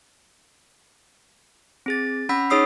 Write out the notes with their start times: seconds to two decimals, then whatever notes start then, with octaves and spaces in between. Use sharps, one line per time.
1.86 C4 G#4 A6
2.29 C#4 F#5 B5 E6 B6
2.50 D#4 G#4 C#5 D#6 E6 C7